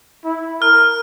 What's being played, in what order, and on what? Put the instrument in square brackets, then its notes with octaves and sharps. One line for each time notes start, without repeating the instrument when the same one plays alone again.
[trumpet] E4
[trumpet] A#4 [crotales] F6